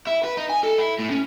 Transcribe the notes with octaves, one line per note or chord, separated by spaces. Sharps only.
E4
B4
D#4
G#5
A4
E4
A2
C#4